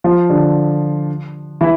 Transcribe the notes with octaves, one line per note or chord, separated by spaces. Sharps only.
F3 F4
D3 D4
E3 E4